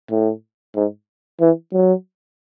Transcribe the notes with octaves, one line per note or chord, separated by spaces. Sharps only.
A2
G#2
E3
F#3